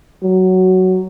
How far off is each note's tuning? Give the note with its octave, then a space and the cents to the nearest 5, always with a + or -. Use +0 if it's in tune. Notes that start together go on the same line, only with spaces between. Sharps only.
F#3 +5